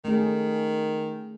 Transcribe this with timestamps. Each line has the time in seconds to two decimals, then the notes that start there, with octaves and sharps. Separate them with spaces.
0.05 D#3 A3 C#4 G#4